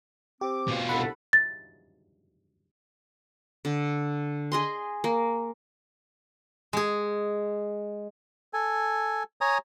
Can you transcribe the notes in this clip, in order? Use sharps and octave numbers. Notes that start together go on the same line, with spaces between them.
C4 G4 D6
B2 F4
C2 D4 A4 F#5 B5
A6
D3
G#4 D#5 C6
A#3
G#3 G#4
A4 G#5
C#5 G#5 A#5 D#6